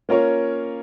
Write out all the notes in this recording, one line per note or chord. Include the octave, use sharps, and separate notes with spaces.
A#3 C#4 F4 A#4 C#5